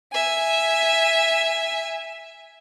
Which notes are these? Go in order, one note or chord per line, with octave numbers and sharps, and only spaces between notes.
E5 G#5